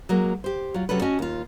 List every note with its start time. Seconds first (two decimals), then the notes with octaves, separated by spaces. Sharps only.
0.09 F#3 G#3 A#3
0.44 G4 C5
0.74 F#3 F4
0.89 C3 F#3 C#4 A4 B4
1.02 C#4 F#4 D#5 G#5 A5
1.19 D#2 F4